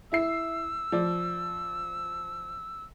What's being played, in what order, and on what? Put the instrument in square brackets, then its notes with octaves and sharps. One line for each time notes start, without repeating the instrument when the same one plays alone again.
[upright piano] E4 E5 C7 [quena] E6
[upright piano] F3 D5